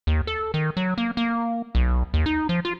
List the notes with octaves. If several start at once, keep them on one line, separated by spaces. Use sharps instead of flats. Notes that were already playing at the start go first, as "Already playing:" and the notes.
D#2
A4
D#3
F#3
A#3
A#3
B1
D#2
D#4
F3
F4